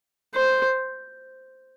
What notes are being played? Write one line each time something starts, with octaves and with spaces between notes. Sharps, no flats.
C5